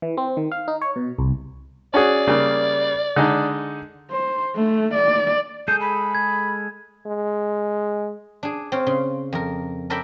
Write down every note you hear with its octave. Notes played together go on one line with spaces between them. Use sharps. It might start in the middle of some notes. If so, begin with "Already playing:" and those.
E3
C4
D#3
F5
D#4
C#5
B2
C2
C#4 F#4 G#4 D5
C#3 G3 A#3
D3 G#3 D#4
C5
A3
D5
G#3 G#4 A4 G6
B5
G#6
G#3
D4 G#4
C4 C5 C#5 F5
C#3 C6
F2 A#4
A4 A#4 D5 E5 G5 B5